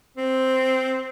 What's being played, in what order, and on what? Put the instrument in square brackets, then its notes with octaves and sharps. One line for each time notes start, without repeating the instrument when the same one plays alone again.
[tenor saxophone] C4